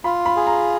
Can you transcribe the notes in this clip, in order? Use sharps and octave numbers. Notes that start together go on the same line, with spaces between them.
F4 B5
B5
G#4
A#5